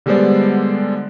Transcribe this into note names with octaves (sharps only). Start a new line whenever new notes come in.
D3 G3 G#3 B3 C5 D5